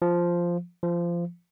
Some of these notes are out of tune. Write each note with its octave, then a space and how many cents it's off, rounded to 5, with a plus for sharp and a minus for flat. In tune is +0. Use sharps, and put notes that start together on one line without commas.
F3 -5
F3 -20